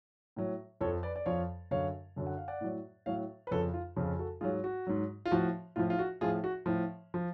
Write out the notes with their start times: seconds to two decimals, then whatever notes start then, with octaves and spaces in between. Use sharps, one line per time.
0.36 A2 F#3
0.81 F2 F3 A4 C#5
1.03 B4 D5
1.16 D5
1.26 F2 F3 C#5 F5
1.71 F#2 D3 F#3 C#5 F5
2.16 F#2 D3 F#3
2.27 F#5
2.37 F5
2.48 D5 F#5
2.61 A2 F#3
3.06 A2 F#3 C#5 F5
3.47 B4
3.51 F2 C#3 F3 A4 C#5
3.74 F4
3.96 F2 C#3 F3
4.19 F#4 A4
4.41 G#2 F#3 F4 G#4
4.64 F#4
4.87 G#2 F#3
5.25 F4
5.31 A2 F3 F#4
5.76 A2 F3 F4
5.90 F4
5.99 F#4
6.21 A2 F3 F4 G#4
6.44 F#4
6.66 A2 F3
7.14 F3